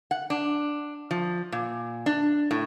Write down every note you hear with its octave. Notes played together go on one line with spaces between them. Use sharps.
F#5
D4
F3
A#2
D4
A2